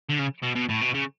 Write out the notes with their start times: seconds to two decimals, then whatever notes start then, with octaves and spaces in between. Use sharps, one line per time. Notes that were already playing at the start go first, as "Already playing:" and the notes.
0.09 D3
0.19 C#3
0.42 B2
0.55 B2
0.69 A2
0.81 B2
0.94 C#3